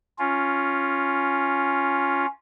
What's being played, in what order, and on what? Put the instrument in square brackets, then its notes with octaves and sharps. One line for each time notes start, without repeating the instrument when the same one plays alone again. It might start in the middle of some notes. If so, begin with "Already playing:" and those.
[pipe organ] C#4 F4